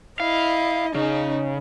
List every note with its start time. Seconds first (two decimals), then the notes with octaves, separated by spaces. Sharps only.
0.20 E4 D#5 F5
0.95 C#3 D#4